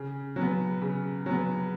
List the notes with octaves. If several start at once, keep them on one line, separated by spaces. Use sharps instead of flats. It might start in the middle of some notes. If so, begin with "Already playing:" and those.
Already playing: C#3
F#3 B3
C#3
F#3 B3